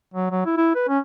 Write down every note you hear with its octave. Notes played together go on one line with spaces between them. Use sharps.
F#3
F#3
E4
E4
B4
C#4